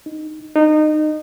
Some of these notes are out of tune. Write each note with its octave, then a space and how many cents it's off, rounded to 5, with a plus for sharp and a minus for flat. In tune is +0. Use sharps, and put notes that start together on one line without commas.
D#4 -10
D#4 -25